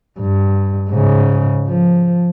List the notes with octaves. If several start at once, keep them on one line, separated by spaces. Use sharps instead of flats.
G2
G#2 C#3
F3